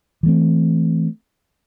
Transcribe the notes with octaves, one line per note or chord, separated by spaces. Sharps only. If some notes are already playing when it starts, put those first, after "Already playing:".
E3 A3 C4